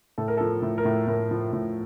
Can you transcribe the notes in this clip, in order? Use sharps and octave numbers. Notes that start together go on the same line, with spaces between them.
A2 A4
A#4
A4
F3
A2
A#4
A2
A2 A#4
F3
A2